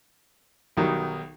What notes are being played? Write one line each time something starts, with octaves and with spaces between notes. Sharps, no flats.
B1 D#3 F#3 G3